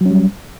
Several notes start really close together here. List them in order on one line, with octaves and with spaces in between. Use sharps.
F#3 C#4 G3